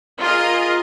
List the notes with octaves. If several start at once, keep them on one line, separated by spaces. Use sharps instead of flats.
F4 G#4 A#4 D#5